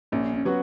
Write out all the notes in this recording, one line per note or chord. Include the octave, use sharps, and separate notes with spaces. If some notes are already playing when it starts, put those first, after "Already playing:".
A#1 C#4
C#4
F#3 B3 F#4